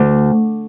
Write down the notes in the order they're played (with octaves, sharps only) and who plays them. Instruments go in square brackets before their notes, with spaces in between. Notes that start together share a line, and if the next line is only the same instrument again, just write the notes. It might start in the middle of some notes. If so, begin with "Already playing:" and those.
Already playing: [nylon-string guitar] D2